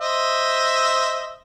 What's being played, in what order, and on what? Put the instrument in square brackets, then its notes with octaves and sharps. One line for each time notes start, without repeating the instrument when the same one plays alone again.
[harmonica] C5 D#5 E5